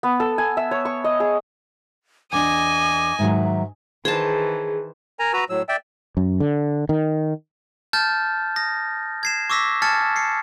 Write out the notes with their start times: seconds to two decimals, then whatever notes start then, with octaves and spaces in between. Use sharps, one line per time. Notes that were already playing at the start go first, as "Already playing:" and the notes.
0.03 B3
0.20 A4
0.38 G#5
0.57 E5
0.71 C#5
0.85 C#6
1.04 D#5
1.20 G#4
2.33 E2 D4 D#5 G#5 D6
3.19 G#2 D#3 F#3 E5
4.05 D#3 E3 G#4 C5 A5
5.19 A#4 G#5 A#5
5.33 F#4 B4 A#5 E6
5.50 A2 F#3 E6
5.69 D5 E5 G5 E6
6.17 F#2
6.40 D3
6.89 D#3
7.93 A5 F6 G6 A6
8.56 D#6 A#6
9.23 G#6 C7 E7
9.50 C#6 D6 E6 A#6 B6
9.82 G#5 A5 F6 G#6 A6 C#7
10.16 C7 C#7